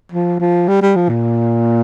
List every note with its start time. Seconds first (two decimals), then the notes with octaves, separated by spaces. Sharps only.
0.12 F3
0.40 F3
0.68 G3
0.82 G3
0.96 F3
1.09 A#2